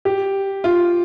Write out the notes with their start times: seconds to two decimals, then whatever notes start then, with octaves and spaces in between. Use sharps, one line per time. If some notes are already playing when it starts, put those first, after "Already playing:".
0.05 G4
0.64 F4